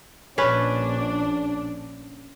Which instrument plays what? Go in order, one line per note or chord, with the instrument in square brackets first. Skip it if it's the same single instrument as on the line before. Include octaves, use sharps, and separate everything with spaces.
[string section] A#1 D4 [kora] C#4 B4